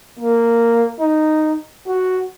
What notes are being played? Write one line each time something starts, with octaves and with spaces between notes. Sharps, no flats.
A#3
D#4
F#4